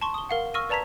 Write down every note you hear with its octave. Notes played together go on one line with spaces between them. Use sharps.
A5 C6 C#6
D#6 G7
A#4 F5 F#5
C#6 E6 F6 A#6 D#7
B4 D5 A5 A#5 G#6 B6